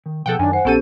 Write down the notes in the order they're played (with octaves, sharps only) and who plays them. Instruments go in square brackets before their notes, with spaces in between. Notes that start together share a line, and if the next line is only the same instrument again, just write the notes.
[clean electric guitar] D#3
[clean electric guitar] B2 F3 G#4 [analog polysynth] A4 F#5 G5
[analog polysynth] F#2 D#3 [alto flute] D4 [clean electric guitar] G#5
[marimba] C5 [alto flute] F#5
[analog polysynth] A#1 A4 D#7 [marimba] B3 C#4 G4